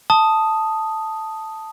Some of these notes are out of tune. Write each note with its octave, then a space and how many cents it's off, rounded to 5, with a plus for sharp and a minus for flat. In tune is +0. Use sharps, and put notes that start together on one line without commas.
A5 +0 D#6 +0